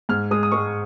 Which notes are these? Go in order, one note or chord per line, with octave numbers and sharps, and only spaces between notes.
G#2 F6
G#3 D#6
D#6
G#3 C#6